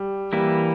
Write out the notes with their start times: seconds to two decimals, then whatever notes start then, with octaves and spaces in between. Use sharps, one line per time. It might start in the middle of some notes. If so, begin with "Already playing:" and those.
Already playing: G3
0.33 E3 G3 A#3 E4